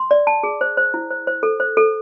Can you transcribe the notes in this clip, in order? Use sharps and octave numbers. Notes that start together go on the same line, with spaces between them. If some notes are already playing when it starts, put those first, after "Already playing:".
Already playing: C6
D5
A5
G#4
C5
C5
E4
C5
C5
A4
C5
A4